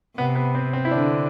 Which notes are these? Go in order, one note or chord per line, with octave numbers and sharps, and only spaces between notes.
C3 B3
B3
C4
C4
E4
D3 D4